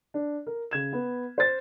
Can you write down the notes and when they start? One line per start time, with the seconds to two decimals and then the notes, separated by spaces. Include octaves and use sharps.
0.14 D4
0.47 A#4
0.71 C#3 G#6 E7
0.93 B3
1.38 C5 A6